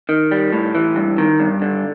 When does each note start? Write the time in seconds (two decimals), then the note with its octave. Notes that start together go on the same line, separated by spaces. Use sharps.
0.09 D#3
0.31 G3
0.53 A2
0.75 E3
0.96 G2
1.18 D#3
1.40 G2
1.62 D3